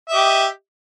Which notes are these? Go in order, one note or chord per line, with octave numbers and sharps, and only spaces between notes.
G4 D#5 E5